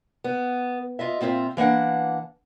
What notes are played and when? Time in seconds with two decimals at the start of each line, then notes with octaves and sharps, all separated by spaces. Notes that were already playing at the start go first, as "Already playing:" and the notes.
0.24 B3
0.99 F4 D#5 E5
1.21 A#2 C4 F4 C#5 E5
1.57 E3 A#3 D4 F#5